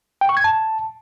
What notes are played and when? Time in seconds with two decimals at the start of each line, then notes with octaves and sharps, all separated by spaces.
0.21 G5
0.29 C#6
0.37 G#6
0.44 A5